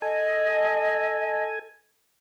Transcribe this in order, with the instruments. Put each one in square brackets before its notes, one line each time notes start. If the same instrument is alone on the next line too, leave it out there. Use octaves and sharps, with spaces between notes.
[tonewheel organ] A4 G#5 [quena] D#5